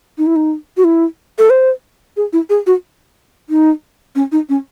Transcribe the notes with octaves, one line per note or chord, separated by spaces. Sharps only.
D#4
E4
D#4
F#4
E4
A4
C5
G#4
E4
G#4
F#4
D#4
C#4
D#4
C#4